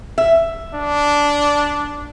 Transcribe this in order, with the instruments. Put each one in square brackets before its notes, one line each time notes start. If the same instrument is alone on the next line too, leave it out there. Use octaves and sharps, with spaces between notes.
[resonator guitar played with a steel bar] E5
[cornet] D4